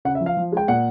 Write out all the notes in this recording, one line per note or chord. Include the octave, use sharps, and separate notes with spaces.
C#3 F#5
E5
F3
F5
F3
G#3 G5
A#2 F#5